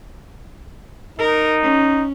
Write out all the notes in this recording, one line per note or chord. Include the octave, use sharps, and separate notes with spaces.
D#4 A#4
C#4